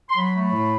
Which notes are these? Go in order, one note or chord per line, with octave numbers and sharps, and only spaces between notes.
C6
F#3 B5
A3
B5
A2